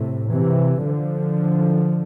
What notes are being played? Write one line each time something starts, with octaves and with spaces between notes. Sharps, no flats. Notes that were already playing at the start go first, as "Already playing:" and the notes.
Already playing: A2 C3
C3 E3
D3 F3